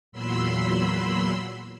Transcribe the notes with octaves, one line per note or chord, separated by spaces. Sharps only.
E2 A#2 F#3 B5 C6 E6